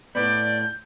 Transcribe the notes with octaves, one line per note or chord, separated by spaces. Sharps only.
A2 B3 D5 G6